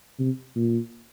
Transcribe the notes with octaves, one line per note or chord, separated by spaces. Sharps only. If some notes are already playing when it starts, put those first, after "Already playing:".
C3
A#2